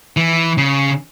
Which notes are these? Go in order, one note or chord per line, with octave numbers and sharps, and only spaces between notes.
E3
C#3